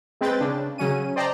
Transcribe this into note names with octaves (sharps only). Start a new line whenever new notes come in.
G#3 C4 B4 G5 A6
C#3 D4
C#3 F#3 C#4 D#7
C5 D5 D#5 G5 A5 A#5